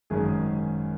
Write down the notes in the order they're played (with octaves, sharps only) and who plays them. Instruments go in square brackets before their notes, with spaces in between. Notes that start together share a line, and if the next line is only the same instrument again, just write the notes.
[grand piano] G#1 F#2 D#3 G#3 C#4 G#4 G#5